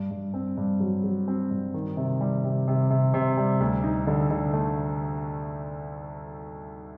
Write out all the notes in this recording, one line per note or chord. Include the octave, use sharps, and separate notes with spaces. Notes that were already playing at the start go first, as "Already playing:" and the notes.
Already playing: G2
G2
C4
G2
F#3
F#3
C4
G2
D#3
C3
G3
C3
C3
C3
C3
G3
D2
D#4
D3
D3
A3